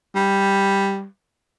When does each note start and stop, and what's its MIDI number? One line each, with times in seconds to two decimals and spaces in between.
0.15 1.05 55